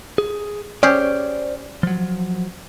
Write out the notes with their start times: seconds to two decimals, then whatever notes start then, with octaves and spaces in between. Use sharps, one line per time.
0.18 G#4
0.83 C#4 G4 G#4 C5 D5
1.83 F3 F#3